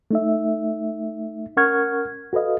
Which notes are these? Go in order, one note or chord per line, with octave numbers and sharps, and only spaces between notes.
A3 D#4 E5
C#4 A#4 F#5 C#6 F6 G#6
F#4 A4 B4 D#5 F5